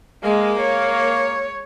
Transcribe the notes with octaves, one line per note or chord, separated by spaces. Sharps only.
G#3 A#3
C#5